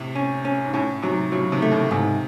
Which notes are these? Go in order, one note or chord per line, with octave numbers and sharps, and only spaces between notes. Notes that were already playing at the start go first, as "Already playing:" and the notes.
Already playing: A2 C3
C#4
C#4
G#2
A2 C#4
G#2 C3 F#3
A2 C#3 F#3
C3 D#3
A3
A2 C#3
G#2 C3 D#3